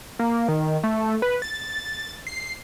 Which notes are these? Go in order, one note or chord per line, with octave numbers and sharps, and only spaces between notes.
A#3
D#3
A3
B4
A6
C7